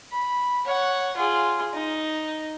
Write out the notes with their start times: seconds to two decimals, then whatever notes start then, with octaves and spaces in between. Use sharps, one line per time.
0.12 B5
0.65 C#5 F#5
1.17 F4 G#4
1.73 D#4